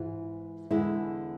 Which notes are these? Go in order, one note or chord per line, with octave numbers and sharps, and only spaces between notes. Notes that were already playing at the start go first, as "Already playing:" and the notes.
Already playing: G#2 E3 F4
E2 D3 G#3 E4